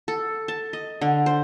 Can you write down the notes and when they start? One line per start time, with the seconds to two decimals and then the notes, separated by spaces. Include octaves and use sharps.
0.08 A4
0.48 A5
0.73 D#5
1.01 D3
1.26 C5